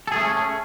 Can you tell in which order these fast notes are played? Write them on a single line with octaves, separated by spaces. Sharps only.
A4 G#4 A3 C#4